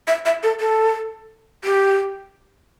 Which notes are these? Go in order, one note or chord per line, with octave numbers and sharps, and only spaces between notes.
E5
E5
A4
A4
G4